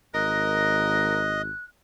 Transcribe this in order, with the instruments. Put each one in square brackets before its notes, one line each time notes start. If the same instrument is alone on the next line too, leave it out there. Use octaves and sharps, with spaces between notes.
[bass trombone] G#1 [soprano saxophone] A#4 [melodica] D#5 [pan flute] F#6